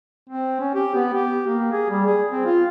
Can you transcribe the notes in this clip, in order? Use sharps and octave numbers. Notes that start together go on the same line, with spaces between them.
C4
C#4
G4
B3
G4
A#3
G#4
G3
G#4
C4
F4